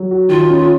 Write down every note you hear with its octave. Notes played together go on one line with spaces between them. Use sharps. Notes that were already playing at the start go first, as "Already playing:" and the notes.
Already playing: F#3
F#4
D#3 F4
C#4